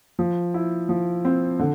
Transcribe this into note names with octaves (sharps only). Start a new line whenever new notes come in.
F3
E4
F3
C4
D3